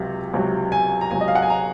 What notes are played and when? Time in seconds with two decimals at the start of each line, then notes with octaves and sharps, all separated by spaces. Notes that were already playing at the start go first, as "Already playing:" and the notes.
Already playing: C#2 C3 F#3
0.34 C#2 C3 F#3
0.72 G#5
1.01 A#5
1.11 C#2 C3 F#3 G#5
1.21 D#5
1.28 F5
1.35 F#5
1.42 G#5
1.50 A#5